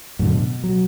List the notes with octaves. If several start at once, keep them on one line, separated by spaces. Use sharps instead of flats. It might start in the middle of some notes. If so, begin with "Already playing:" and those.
F#2 A2 D3
B2
F#3